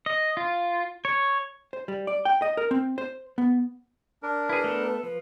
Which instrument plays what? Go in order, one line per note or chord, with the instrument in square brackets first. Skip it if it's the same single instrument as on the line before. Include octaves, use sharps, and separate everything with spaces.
[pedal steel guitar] D#5
F4
C#5
[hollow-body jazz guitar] C5
G3
D5
G5
D#5
A#4
C4
C5
B3
[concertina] D4 A#4
[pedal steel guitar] E4 G#4 [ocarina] B4
[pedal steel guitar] A3 B3 A4
[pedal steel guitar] F3 [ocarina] B4